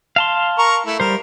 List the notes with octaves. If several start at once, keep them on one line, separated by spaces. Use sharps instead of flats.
F5 A5 C6
A#4 A#5 C#6
A3 E4
G3 A#4 C5